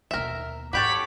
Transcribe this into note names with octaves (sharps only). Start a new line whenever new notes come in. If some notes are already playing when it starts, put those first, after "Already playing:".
D#2 B2 A#4 E5
G#2 F#4 G4 A4 C#5 B5 D6